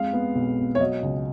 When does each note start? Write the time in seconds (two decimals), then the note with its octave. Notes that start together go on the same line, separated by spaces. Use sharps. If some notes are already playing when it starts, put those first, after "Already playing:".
Already playing: F2 G#3 F5
0.13 B3
0.35 B1
0.58 B2
0.75 C#5
0.80 F#3 D#5
1.03 C#2